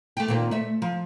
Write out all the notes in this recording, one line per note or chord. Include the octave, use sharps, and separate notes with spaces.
A3 G4
A#2 D#3 C4
A3 E5
F3